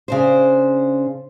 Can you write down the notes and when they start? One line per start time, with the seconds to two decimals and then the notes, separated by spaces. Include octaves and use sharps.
0.08 C#3 D4 C5